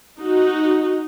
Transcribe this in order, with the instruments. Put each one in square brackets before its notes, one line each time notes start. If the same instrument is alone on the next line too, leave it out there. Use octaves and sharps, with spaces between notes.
[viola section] D#4 F#4